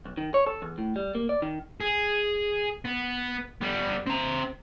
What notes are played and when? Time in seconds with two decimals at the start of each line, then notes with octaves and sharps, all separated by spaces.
0.05 B1
0.17 D#3
0.34 C#5
0.47 A4
0.62 E2
0.78 A2
0.96 G3
1.15 A#3
1.29 D5
1.42 D#3
1.81 G#4
2.85 B3
3.61 G3 B3
4.07 C4 A#5